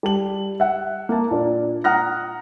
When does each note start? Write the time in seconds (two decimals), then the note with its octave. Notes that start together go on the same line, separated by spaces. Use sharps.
0.03 G3 A5 F#7
0.60 E5 F#5
1.09 A#3 A5
1.31 A#2 D4 D5
1.84 F#5 A#5 D#6 F6 F#6 A#6